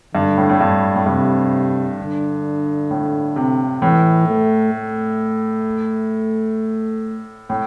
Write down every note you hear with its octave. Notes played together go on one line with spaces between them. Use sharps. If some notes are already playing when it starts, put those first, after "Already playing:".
G2 D3
A2
A2
G2
A2
G2 C3
D3
A2
C3
A2 E3
A3
A3
A2